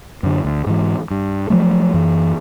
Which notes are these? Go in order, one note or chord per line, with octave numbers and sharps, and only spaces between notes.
F#2 D3
D2
G#2 E3
G2
F3 F#3 A3
F#2 E3